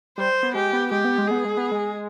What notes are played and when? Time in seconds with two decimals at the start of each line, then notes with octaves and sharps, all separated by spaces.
0.18 G3 C5
0.43 B3
0.55 G#3 G4
0.73 B3
0.91 G#3 G4
1.05 B3
1.18 G#3
1.27 B3 G#4
1.45 G#3
1.57 B3
1.72 G#3